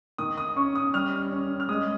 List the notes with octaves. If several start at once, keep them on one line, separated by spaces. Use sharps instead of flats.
D#3 D#6
D#6
C#4 C#6
D#6
G3 F6
C#4
F6
G#3 D#6